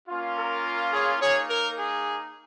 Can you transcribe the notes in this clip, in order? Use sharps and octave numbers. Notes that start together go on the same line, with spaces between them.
A#3 C#4 F4
A#4
G#4 C#5
A#3 D#4 G#4 C#5
A#4
G#4